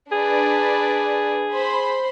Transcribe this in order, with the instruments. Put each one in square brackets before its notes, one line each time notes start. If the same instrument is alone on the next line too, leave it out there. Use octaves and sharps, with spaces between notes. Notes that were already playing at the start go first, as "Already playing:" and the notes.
[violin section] D4 B4 D5 [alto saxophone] G#4
[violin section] C5 B5 C6